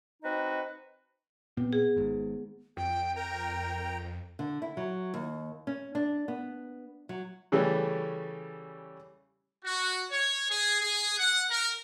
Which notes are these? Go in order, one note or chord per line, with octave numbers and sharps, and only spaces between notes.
C4 D#4 F#4 B4 D#5
A#2 B3 C4
G#4
G#1 G#2
F2 G5
A#4 G5 A#5
D3
E4
F#3
D#2
C#4
D4
B3
F#3
C#3 E3 G3 A3 C#4
F#4
C#5
G#4
G#4
F#5
A#4